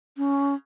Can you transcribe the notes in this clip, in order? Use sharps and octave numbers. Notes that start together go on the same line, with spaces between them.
C#4